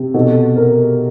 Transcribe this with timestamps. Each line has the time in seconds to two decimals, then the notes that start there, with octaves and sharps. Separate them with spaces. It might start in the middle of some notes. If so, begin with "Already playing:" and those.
Already playing: C3
0.14 B2 A4
0.56 B2 A#4